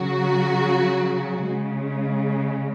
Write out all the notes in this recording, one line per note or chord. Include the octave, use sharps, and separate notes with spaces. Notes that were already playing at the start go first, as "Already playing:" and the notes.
Already playing: C#3 F#3 F#4
C#3 G#3